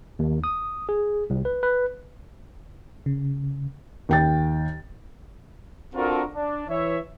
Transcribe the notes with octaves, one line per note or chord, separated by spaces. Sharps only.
D#2
D#6
G#4
C2
B4
B4
C#3
D#2 G5 A6
C4 D4 F4 F#4 A4 A#4
D4
E3 C#5 E5